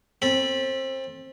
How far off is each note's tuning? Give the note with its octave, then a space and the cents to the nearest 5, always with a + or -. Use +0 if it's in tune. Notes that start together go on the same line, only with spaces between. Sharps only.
C4 +25 A4 +0 B5 -20